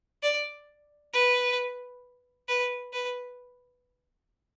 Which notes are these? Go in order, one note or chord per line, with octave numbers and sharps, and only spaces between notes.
D5
B4
B4
B4